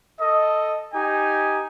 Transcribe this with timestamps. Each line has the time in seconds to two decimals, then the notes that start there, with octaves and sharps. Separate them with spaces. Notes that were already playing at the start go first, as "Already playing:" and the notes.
0.19 A4 D#5
0.94 D#4 G4 G#5